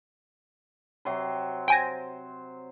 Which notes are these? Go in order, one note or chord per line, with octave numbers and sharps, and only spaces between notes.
C3 F#3 C6
C5 G5 G#5 A#6